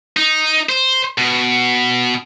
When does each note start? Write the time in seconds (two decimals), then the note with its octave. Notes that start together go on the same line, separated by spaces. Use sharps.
0.17 D#4
0.69 C5
1.18 B2